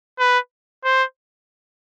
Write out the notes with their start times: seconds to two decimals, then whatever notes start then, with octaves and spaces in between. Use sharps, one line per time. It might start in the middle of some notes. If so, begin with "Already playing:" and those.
0.19 B4
0.84 C5